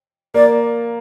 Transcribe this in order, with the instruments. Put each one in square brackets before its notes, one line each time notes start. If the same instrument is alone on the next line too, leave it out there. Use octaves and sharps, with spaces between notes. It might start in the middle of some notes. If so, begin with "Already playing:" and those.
[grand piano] A#3 [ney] D5